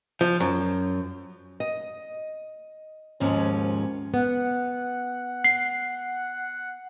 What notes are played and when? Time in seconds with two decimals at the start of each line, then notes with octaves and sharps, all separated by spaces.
0.21 F3
0.40 F#2
1.60 D#5
3.20 D#2 G#2 F3 G#3 C#4
4.14 B3 F#5
5.44 C7